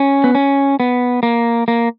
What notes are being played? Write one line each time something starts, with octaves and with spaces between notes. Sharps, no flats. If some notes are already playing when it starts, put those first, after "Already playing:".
Already playing: C#4
B3
C#4
B3
A#3
A#3